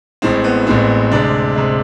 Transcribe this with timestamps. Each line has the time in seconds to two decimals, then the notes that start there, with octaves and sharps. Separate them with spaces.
0.22 A1 A2 G#3 C4
0.44 B3
0.67 A1 A2 G#3 C4
1.11 D2 C3 G#3 D4
1.55 C3 G#3